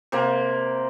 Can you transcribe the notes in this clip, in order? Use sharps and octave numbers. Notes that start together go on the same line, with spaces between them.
C3 A#3